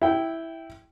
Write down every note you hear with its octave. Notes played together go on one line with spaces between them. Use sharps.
E4 G5